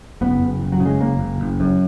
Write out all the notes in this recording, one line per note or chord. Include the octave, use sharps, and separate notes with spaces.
F#1 B3
F#1
F#1
F#3
C#3
G#3
F#1 A#3
F#1
F#1
F#2